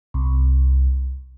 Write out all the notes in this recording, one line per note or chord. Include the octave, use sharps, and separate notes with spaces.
C2